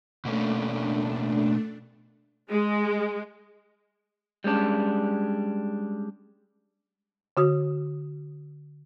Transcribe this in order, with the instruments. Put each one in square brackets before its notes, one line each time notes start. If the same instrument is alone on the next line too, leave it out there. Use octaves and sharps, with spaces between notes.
[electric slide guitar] B2 A#3 C#4 [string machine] A3 D4
[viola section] G#3
[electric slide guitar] G3 G#3 C#4 D4
[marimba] D3 F#4 D#6